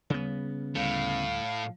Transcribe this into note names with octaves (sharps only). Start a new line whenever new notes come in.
D#2 C#3 G3 B3
D2 A2 G3 F5